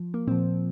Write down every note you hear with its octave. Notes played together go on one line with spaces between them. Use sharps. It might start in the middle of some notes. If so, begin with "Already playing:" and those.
Already playing: F3
A#3
A#2 F3 C4